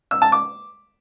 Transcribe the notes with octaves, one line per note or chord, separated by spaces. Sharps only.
E6
A5
D6